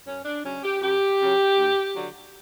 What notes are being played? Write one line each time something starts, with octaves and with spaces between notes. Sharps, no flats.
F#2 C#4
D4
C#3 F#3 C#4
G4
F#2 G4
C#3 F#3
D2
D3 F#3